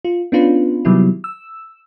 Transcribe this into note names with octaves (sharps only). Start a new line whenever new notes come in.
F4
B3 C#4 D4 F4 B4
C3 D#3 F#3 G3 B3 E4
E6